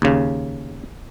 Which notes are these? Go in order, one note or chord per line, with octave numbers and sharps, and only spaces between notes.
D#2 C#3